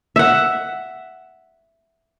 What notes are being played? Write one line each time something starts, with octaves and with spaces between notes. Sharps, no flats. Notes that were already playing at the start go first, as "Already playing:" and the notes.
E5 F#5